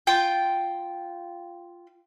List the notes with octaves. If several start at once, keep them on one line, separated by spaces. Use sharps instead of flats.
F4 G5